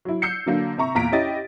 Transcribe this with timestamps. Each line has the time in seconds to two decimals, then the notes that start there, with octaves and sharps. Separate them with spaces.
0.05 F#3 E4
0.22 E6 G6 C7 C#7
0.46 D3 F#3 A#3 D4
0.78 C3 E5 A#5 C#6
0.95 E2 A#2 A#5 B6 D7
1.12 C#4 E4 G4 D#5 A6